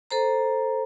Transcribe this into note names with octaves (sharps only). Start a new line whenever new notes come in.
A4 C5 A#5